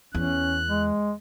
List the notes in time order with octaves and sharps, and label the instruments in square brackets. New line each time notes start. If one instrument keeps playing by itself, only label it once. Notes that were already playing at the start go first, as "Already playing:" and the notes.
[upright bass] E2 [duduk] C#4 [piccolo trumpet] F#6
[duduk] G#3